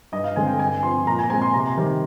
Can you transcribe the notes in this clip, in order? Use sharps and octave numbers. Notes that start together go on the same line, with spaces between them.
G2 D#5
F5
D3 G#3 C4 G#5
G5
G2 G#5
F3 C4 C6
A#2 A#5
G#5
G#3 C4 G#5
C6
C3 A#5
D#3 G3 C4